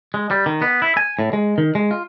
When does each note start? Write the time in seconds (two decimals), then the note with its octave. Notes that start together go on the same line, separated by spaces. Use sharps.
0.14 G#3
0.31 G3
0.46 D#3
0.62 B3
0.82 E4
0.97 G#5
1.19 A2
1.33 G#3
1.58 D#3
1.75 G#3
1.91 F4